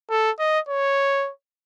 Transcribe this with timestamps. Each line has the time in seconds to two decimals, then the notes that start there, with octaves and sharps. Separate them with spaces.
0.10 A4
0.39 D#5
0.69 C#5